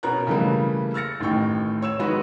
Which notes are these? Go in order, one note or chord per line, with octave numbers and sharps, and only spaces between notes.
B2 B3 C#4 A#4 A#5 F#6
C#3 E3 G3 A3 A#3
E6 F6 A6 A#6 C#7
A1 A2 D#3 G5 C#6
C#5 E6 E7
D#3 G#3 B3 F#4 B4